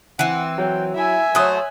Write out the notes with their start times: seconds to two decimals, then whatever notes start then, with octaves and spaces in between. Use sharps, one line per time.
0.19 E3 C4 F#5
0.58 F#3 G5
0.95 E4 E5 G#5
1.35 F#3 A3 C5 C#5 D#6 F#6